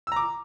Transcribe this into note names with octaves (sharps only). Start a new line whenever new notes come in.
A#5 D6 E6